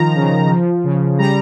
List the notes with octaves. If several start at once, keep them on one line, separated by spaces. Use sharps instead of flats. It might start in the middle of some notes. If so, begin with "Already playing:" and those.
Already playing: D#3 F3 A#5
C#3
F3
C#3
G3 A#5